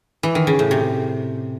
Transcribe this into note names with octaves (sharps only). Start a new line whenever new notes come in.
E3
D#3
C#3
A2
C3